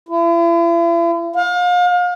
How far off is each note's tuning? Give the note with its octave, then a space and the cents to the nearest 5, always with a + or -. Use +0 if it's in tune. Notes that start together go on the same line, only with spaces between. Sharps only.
E4 +45
F5 +35